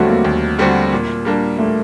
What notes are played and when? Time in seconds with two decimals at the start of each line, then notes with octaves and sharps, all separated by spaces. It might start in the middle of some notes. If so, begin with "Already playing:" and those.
Already playing: D#2 D3 F#3 G3 A3 C4 F#4
0.08 A#3
0.24 D#2
0.59 D3 G3 C4 F#4
0.92 A#2
1.25 G3 A#3 D4
1.58 A#2 A3